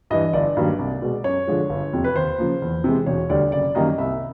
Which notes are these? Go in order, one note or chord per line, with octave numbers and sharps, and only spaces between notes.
G2 E3 D#5
G1 D5
G2 D#3 F#3 A#3
C2
B2 G#3
F#2 C#5
D3 F3 G#3
G1
F2 C3
B4
D#2 C5
C#3 F3 A#3
E2
C3 E3 G#3
E1 C#5
D2 D3 G3 D5
F#1 D5
F#2 D#3 G3 A#3 D#5
C2 E5